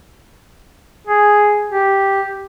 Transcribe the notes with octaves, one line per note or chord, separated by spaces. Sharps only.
G#4
G4